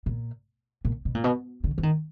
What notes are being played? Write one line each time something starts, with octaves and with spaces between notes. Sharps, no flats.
A#2
A#2
B2
A#2
B2
D3
E3
D#3